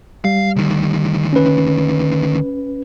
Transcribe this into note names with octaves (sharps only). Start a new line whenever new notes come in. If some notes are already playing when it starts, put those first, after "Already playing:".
G3 F5
D2 D#3
C#4 B4